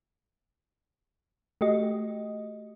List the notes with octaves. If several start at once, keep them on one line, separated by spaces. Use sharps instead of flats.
A3 F#4 G4 D#5